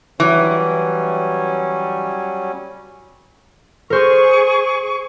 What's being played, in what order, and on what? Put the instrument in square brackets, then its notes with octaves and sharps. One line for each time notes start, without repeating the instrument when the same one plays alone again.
[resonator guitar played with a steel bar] E3 [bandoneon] F#3 G3 C#4
[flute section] G#4 C#6 [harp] A#4 C5